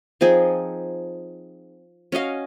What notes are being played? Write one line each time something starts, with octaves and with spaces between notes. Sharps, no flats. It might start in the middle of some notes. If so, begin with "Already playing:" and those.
F3 C4 D#4 G#4
C#4 F#4 D#5 F5